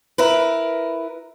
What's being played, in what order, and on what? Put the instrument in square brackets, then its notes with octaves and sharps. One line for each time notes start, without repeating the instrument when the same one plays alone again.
[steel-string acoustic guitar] E4 A#4 B4